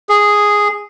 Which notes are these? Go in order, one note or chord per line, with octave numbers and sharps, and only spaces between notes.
G#4